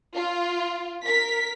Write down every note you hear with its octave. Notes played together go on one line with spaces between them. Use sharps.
F4
A#4 B6